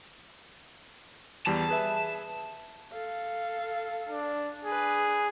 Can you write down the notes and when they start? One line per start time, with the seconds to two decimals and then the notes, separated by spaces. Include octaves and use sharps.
1.47 E2 G3 A5
1.69 G#4 B4 E5
2.92 A4 F5
4.09 D4
4.65 D4 G#4 B4